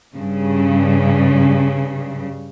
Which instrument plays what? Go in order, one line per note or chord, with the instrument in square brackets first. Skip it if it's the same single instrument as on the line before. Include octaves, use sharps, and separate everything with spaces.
[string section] G2 C#3